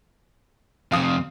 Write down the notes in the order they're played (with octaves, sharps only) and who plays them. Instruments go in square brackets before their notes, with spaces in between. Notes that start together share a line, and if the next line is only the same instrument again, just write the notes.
[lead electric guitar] F2 C3 [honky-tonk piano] F5 D#6